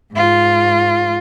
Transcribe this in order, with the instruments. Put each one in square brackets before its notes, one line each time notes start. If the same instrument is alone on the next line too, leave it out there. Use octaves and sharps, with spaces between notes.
[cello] G#2 F4